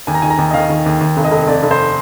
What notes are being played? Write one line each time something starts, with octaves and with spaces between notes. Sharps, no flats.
D#2 G#5
A#5
D#3 G#5
A#5
D#2
D#5
D#3 F5
D#3
D#2
D#2
F1
D#5
F1
F1 D5
F1
C5